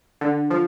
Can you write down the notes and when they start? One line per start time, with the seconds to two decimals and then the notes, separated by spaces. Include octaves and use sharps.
0.21 D3
0.50 F3